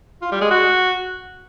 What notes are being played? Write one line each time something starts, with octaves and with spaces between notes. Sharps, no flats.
F4
G3
G#3
F#4